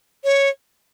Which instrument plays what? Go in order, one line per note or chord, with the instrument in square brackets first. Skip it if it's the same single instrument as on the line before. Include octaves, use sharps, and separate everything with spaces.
[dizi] C#5